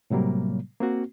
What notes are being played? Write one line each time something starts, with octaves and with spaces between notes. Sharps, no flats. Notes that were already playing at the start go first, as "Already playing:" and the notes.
A2 C3 F#3 G3 A#3
A#3 C4 F#4